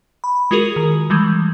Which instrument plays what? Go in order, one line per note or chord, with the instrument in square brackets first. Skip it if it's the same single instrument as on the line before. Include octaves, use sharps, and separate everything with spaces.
[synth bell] B5
G#3 F4 F#4 G#4 A#4
D#3
E3 G3 G#3